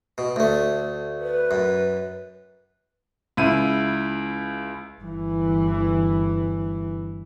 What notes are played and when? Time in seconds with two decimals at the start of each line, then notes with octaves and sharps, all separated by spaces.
0.18 B2
0.36 D2 A3
1.20 B4
1.51 F#2
3.37 C#2 E4 D#7
5.01 G1 E3